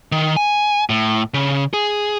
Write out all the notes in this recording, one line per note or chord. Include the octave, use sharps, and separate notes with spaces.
D#3
G#5
A2
C#3
G#4